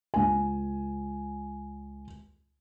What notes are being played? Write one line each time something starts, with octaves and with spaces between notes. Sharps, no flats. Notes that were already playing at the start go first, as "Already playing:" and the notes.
C#2 G#5